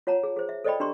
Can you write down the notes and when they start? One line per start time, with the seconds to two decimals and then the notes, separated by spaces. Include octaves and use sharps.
0.07 F4 C#5 F#5 A5 A#5
0.23 G#4
0.36 G#4 C5
0.49 E5
0.64 A4 C5 D5 D#5 G5 B5
0.80 D4 G4 A#5 C6 C#6